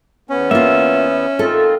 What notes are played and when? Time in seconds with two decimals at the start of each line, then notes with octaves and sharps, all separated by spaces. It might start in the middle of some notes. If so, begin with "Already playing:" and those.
0.29 E2 B3 C#4
0.51 A#3 F4 E5
1.39 D#3 C4 F4 A4